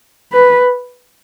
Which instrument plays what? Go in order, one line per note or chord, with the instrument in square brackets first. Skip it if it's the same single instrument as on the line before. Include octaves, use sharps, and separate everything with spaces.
[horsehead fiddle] B4